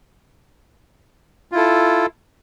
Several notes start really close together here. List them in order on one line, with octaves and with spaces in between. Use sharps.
F4 E4 A4